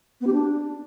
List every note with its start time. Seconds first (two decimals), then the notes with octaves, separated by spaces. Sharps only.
0.21 B3
0.27 G4
0.33 D4